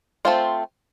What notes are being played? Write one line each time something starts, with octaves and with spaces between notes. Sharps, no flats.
A3 C4 F4 C5